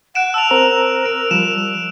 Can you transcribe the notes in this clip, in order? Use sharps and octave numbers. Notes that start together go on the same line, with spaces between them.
F#5 F#6 D7 E7
A5 E6 F7
C4 A#4 C5 A#5
D7
F3 G3 E7